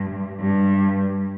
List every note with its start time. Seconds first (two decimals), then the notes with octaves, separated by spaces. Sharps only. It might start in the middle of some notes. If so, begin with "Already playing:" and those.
Already playing: G2
0.40 G2